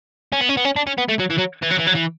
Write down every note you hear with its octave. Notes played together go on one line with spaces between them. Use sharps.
C#4
B3
C#4
B3
C#4
D4
C#4
B3
A3
F#3
E3
F#3
E3
F#3
E3
F#3
E3